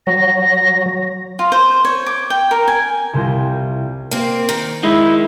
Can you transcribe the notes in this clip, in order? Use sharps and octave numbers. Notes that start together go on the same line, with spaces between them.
F#3 A#6
F4
C5
C#5
D6
G5
A#4
G#5
C2 C3 G3 F4 G6 A#6
A#3 C4
D#3
G#3 D#4 E4